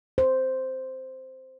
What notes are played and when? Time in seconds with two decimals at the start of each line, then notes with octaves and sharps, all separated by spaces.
0.18 C5